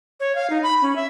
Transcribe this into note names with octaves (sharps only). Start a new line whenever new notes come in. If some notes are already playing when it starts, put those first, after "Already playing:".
C#5
F5
D#4
B5
C#4
E5